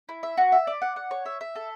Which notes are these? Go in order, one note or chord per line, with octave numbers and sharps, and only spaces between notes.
E4
E5
F#4
E5
D5
F#5
F#5
C#5
E5
E5
A4